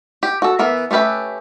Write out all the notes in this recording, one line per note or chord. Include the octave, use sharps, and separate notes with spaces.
G4
F#4 A4
E3 B3 A#4 E5
A3 C#4 G4 B4 E5